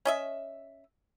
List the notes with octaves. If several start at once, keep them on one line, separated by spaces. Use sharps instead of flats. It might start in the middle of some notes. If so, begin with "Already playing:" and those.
C#4 D#5 E5